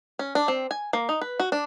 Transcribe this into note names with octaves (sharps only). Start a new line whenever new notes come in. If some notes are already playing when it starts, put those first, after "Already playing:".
C#4
D4
C4
G#5
A#3
D#4
B4
F#4
D4